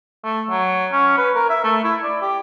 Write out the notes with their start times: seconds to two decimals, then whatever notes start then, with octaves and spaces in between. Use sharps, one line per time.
0.23 A3
0.50 F#3
0.92 C#4
1.18 B4
1.35 A#4
1.50 E5
1.64 A3
1.84 E4
2.04 D5
2.22 G4